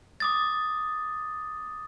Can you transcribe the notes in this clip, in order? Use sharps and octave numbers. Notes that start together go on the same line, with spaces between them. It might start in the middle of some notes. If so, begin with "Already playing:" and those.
D6 D#6 A6